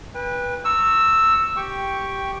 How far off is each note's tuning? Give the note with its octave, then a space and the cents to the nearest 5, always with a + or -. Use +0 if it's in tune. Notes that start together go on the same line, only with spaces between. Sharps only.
B4 -15 G5 +35
A#5 -30 C#6 +0 E6 +0
G4 -5 G5 +0 C#6 +0